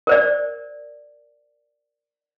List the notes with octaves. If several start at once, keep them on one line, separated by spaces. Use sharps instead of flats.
A#4 C5 D5